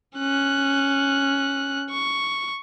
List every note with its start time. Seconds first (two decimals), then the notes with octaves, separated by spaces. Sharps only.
0.17 C#4 F#6
1.91 C#6